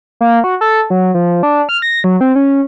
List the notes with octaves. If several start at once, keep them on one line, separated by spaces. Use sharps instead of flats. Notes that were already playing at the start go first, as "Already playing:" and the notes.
A#3
F#4
A4
F#3
F3
D4
F6
A#6
F#3
C4
C#4